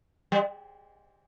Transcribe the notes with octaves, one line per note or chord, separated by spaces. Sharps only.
G3